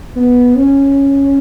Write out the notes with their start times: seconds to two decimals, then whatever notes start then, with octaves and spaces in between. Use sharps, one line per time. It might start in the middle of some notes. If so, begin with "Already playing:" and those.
0.16 B3
0.57 C#4